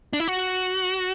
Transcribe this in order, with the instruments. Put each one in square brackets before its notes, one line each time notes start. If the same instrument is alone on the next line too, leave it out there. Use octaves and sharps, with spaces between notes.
[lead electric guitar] D4
E4
F#4